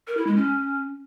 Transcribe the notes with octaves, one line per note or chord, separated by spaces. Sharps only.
A#4
E4
G#3
C#4